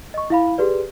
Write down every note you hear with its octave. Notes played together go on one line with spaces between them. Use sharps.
D#5 C#6
E4 F5 B5
G4 G#4 B4 D5